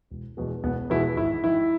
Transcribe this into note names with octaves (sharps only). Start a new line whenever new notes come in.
E1
E2 B2 G#3
E1 B3
E2 B2 G#3 E4
G#1 E4
G#2 D#3 E4